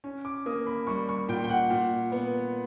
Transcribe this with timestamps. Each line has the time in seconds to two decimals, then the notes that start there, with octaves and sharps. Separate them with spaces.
0.04 C#4
0.25 D6
0.46 A#3 D#6
0.67 B5
0.87 G3 C#6
1.09 C#6
1.29 A#2 G5
1.44 G5
1.49 F#5
1.70 A#2
2.12 B3